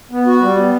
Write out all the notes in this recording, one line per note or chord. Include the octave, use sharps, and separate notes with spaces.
B3
F#4
G3
B3